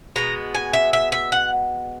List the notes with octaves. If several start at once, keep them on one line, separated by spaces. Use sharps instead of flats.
B2 G#3 B3 A#5
G#5
E5
E5
E5
F#5